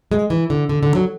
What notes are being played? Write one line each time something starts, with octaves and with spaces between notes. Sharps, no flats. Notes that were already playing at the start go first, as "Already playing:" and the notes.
G#3
E3
D3
D3
D3
F#3